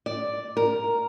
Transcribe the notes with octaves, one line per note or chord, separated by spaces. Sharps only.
D5
A#4